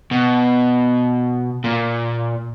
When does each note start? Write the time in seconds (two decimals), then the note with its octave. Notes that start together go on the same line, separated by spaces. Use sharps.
0.11 B2
1.64 A#2